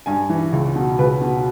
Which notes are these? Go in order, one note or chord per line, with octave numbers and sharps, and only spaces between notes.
G2 G#5
E3
C#2
B2
C#2 B4
B2